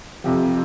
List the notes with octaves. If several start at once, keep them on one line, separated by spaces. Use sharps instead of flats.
F2 C3 F3 G4